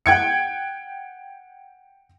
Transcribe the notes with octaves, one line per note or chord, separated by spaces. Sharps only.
F#5 G5 G#6 C#7